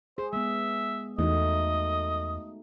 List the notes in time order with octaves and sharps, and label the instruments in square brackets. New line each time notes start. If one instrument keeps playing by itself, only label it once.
[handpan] G#4 [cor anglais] C5
[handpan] G#3 B3 [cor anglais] E5
[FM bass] E2 [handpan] A3 D#4 F#4 [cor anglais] D#5